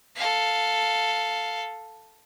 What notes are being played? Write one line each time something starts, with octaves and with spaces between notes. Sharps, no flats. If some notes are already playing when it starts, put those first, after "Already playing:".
A4 F5